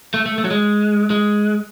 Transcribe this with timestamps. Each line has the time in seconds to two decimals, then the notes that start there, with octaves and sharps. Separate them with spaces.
0.14 A3
0.26 A3
0.38 A3
0.44 F#3
0.51 G#3
1.10 G#3